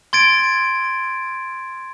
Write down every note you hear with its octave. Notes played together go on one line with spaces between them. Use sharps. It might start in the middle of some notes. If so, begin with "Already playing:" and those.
C6 G#6 A6 D7